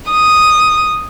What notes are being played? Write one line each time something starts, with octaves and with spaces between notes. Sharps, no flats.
D#6